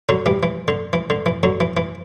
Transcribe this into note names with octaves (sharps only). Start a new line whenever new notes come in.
D3 F#3
E3 G3
E3
D3
E3
D3
E3
D3 F#3
E3
E3